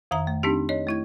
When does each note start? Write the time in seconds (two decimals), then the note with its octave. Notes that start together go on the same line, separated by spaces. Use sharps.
0.11 F2 D#3 E5 A#5
0.27 A3
0.43 C4 D4 D#4 G4
0.69 C#5 D#5
0.87 A3 E4 G#6